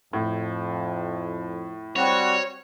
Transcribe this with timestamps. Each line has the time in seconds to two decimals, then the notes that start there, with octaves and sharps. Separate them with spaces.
0.13 F2 A2
1.96 G3 C4 F#4 C#5